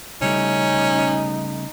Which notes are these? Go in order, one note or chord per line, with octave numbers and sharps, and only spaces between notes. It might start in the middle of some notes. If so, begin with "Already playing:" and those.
C#3 G3 A3 C#4 D#4